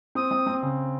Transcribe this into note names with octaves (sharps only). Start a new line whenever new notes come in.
C4 D#6
C4
C4
C#3